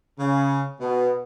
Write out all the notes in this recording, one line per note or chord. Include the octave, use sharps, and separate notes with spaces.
C#3
B2